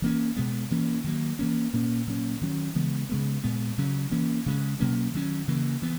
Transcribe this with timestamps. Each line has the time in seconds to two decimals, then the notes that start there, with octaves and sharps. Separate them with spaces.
0.02 E3 A#3 C#4
0.37 B2 G#3 B3
0.71 E3 A#3 C#4
1.04 D#3 F#3 A#3
1.39 E3 A#3 C#4
1.73 A#2 A#3 C#4
2.07 A#2 F#3 A#3 C#4
2.41 D#3 F#3 C#4
2.75 C#3 E3 G#3 B3
3.09 C#3 G#3 B3
3.44 A#2 G#3 B3
3.78 C#3 F#3 C#4
4.12 E3 A#3 C#4
4.46 C#3 G#3 C#4
4.80 B2 F#3 A#3 C#4
5.14 D#3 F#3 C#4
5.48 C#3 E3 A#3
5.82 E3 B3